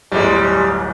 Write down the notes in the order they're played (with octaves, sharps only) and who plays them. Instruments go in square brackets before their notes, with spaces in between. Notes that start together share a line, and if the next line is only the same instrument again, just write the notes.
[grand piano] D1 G1 [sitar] G3 G#3